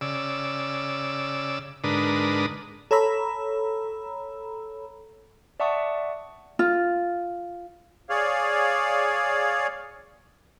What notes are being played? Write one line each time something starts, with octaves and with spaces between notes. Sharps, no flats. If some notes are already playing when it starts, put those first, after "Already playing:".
C#3 D5 E6
G#2 D3 D4 A#4 B4 D#6
A4 C#5 A#5 B5 E6
D5 E5 F#5 A5 C#6 D#6
F4
G#4 C#5 D5 F5